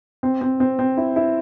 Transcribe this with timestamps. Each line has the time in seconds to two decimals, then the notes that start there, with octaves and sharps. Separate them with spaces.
0.23 C4
0.41 C4
0.60 C4
0.79 C4
0.97 E4
1.16 E4